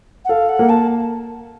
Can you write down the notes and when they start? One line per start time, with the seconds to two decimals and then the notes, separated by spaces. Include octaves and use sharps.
0.25 F#5
0.29 A4 F5
0.49 F#5
0.59 A#3
0.69 A5